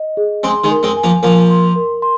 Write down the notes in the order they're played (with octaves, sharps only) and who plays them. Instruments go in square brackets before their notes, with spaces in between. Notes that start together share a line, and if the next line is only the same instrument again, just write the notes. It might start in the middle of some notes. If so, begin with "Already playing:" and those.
Already playing: [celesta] D#5
G#4
[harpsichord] G#3 C4 [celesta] C6
[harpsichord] D#3 G#3
[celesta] A#4
[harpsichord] G#3 C4
[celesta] G#5
[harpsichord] F3 A#3
[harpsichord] F3 A#3 [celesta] A#4
[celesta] C6
A#4
C6